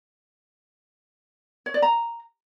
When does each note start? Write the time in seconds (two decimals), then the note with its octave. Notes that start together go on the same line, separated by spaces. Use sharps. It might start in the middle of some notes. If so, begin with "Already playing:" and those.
1.66 C#5
1.74 D5
1.82 A#5